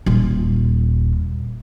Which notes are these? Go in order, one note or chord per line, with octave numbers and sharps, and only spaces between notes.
D#1 F4